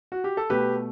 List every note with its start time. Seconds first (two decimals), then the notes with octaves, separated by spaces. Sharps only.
0.12 F#4
0.24 G4
0.37 A4
0.50 B2 A3 G4 B4